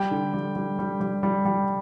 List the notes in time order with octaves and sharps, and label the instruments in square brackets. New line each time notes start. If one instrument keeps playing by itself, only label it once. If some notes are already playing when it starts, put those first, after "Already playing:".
Already playing: [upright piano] G3 G5
D3
G3
G3
G3
G3
G3
G3